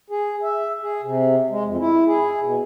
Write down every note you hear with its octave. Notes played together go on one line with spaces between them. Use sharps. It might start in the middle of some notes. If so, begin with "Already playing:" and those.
G#4
E5
G#4
C3
G#3
F2
E4
G#4
B2